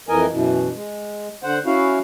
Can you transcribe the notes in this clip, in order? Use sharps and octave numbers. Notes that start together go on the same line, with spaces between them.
F2 E3 A#4 D#5 G#5
F#2 B2 E3
G#3
D3 C5 F#5
C#4 E4 F#4 F5